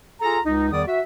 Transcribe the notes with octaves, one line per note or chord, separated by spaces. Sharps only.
F4 G#4 A4 A#5
C#2 D#4
E2 D#3 G3 D5 D#6
F#4 E5